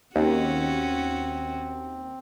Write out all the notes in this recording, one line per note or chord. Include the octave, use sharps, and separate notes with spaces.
D#2 C4 C#4 F#4